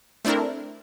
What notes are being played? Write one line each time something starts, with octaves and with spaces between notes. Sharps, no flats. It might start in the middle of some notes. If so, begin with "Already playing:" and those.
A3 C4 D4 E4 A#4